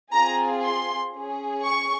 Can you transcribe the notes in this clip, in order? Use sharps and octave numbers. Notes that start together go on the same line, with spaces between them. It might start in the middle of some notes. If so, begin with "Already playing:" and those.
C4 F4 G#4 A#5
C6
C#4 G#4
C#6